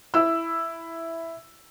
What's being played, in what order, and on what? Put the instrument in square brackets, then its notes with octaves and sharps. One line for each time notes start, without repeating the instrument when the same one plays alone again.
[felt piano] E4 E6